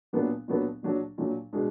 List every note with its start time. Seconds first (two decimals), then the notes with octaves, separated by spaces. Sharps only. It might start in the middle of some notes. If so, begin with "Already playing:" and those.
0.13 A#2 F#3 B3 D4
0.48 A#2 F#3 B3 D4
0.83 A#2 F#3 D4
1.18 A#2 F#3 D4
1.53 B2 G#3 D4